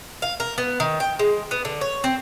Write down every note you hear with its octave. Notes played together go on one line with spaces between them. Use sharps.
F5
A#4
B3
D#3
G5
G#3
B3
D3
C#5
C4